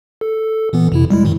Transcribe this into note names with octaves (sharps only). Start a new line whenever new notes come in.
A4
A#2 E3 B3
F2 C3 E4
G3 G#3 E4
G2 A#2 D#3